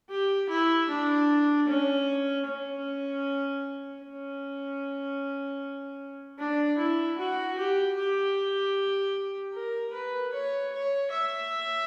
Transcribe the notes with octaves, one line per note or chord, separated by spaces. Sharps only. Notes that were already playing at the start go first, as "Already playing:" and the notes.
G4
E4
D4
C#4
C#4
C#4
D4
E4
F#4
G4
G4
A#4
B4
C#5
C#5
E5